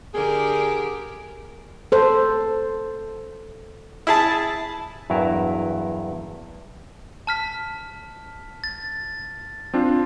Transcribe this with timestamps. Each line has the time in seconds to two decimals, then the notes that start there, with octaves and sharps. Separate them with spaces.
0.14 D3 G4 G#4 A#4
1.92 A4 C5
4.07 E4 G#4 A5
5.10 E2 G2 F#3 E4 A#4
7.27 A5 F6 B6
8.64 A6
9.74 C4 D4 F4